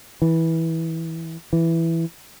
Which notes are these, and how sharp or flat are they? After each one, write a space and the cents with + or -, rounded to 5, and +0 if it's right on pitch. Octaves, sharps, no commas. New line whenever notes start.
E3 -15
E3 +5